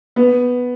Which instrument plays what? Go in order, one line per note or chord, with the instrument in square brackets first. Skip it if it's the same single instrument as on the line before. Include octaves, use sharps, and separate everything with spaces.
[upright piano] B3